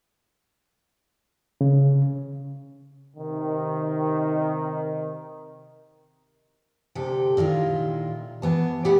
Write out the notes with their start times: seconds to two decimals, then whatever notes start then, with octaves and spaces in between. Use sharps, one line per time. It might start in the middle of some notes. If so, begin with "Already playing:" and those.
1.61 C#3
3.17 C3 D#3
6.95 D2 C3 G4 A4
7.37 A#2 D#3 E4 F4
8.42 E3 B3 A5
8.85 A#2 A3 G4 G#4 B4 F#5